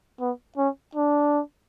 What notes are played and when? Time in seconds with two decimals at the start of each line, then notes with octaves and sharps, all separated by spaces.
0.20 B3
0.57 C#4
0.96 D4